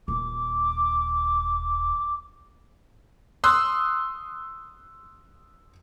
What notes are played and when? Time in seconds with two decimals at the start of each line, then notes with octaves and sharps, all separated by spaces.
0.08 D#1 D6
3.44 C6 D#6 E6 F#6